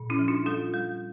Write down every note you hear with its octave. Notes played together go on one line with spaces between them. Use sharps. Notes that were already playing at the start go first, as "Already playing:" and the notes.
Already playing: A#2
C#4 E4
F3
D4 F4
G3 F4 A4
G3